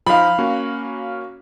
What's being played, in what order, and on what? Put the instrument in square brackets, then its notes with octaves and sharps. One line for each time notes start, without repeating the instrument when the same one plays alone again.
[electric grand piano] F3 D#4 [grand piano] F5 B5
[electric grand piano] A#3 C#4 F#4